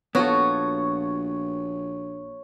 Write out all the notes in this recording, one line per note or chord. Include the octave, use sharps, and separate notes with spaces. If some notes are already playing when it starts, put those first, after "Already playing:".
A#1 B3 F4 F#4 A4 C#5